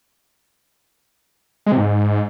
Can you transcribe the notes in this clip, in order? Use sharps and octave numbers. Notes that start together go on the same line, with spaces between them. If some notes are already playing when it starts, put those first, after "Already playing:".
G#3
C3
G#2